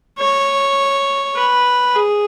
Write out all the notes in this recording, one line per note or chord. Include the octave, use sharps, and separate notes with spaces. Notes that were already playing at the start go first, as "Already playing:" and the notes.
C#5
B4
G#4